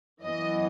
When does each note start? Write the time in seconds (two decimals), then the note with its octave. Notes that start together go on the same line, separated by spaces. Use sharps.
0.23 F#2 E3 B3 D#5